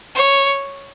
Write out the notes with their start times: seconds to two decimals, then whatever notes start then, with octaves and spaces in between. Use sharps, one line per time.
0.15 C#5